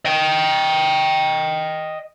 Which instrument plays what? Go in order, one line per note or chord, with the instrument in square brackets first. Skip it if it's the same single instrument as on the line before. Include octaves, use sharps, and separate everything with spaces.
[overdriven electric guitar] D#5 G5